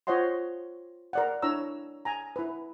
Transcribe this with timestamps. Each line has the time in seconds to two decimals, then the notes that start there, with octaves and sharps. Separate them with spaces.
0.07 F4 C5 C#5 D#5 F#5 C6
1.13 A#4 D5 F#5
1.42 D4 E4 C#5 A#5 E6
2.05 G#5 A#5
2.36 E4 B4